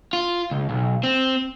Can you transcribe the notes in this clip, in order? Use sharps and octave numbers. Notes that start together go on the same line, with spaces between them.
F4
C#2
B1
C4